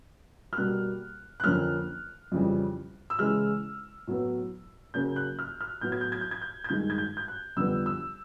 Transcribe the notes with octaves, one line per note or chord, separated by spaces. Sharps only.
F6
B2 G3 A#3 F#6
F#6
F2 D3 F3 A#3 C#4 F6
F2 C#3 E3 G3
E6
C#3 E3 G#3 F6
A2 F#3 B3
C#3 F#3 A#3 C#4 G6
F#6
F6
F6
A2 F#3 B3 G6
G#6
G6
G#6
G6
G#6
G6
G#6
G2 D#3 G#3 G6
G#6
G6
G6
F#6
F2 D3 G3 B3 E6
E6